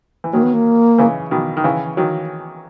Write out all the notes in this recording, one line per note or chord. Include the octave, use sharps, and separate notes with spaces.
E3
D#3 F#3 A#3
B3
A#3
C#3 E3
B2 D#3
D#3
C#3 E3
D#3 F#3